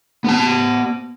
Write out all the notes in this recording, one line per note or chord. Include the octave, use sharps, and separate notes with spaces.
B3 A5